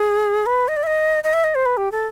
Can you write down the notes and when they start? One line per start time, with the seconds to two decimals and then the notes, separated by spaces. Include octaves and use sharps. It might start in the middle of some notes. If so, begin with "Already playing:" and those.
Already playing: G#4
0.46 B4
0.68 D#5
0.76 D5
0.83 E5
0.87 D#5
1.24 D#5
1.33 E5
1.44 D#5
1.55 C5
1.66 B4
1.77 G4
1.92 A4